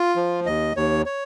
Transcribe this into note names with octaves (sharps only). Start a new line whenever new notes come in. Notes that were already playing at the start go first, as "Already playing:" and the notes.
Already playing: F4
F3
D#2 D#5
D#2 C#5
C#5